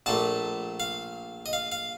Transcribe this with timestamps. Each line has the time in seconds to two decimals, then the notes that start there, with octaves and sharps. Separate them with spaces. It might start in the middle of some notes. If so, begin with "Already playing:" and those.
0.06 A#1 A#2 A3 A5
0.80 F5
1.46 D#5
1.53 F5
1.72 F5